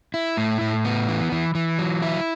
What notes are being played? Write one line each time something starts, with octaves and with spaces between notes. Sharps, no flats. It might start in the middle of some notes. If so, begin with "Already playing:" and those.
E4
A2
A2
B3
E3
E3
E3
F#3
E4